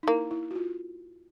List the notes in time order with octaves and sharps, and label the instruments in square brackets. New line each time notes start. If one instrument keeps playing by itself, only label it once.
[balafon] D#4
[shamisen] A#3 [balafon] E4
[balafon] E4
F#4
F4